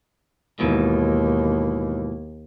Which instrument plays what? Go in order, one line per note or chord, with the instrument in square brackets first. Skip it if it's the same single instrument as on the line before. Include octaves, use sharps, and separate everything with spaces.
[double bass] D#2 [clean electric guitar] G#2 B2 E3